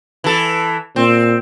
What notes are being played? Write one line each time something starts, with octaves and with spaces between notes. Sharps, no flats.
E3 A4
A#2 C4